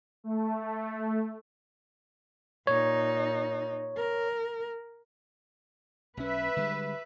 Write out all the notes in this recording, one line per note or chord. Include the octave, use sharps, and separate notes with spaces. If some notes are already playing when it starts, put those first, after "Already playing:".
A3
A#2 D#4 C#5
A#4
B1 C#4 B4 E5
D3 G3 G#3